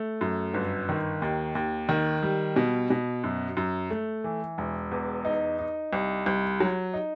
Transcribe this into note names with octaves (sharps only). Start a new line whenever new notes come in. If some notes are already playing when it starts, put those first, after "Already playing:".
Already playing: A3
F#2
G1
D#3
D#2
D#2
D#3
G3
B2
B2
F#2
F#2
A3
E3
E1
E2
D#4
D#4
C2
C2
F#3
D#4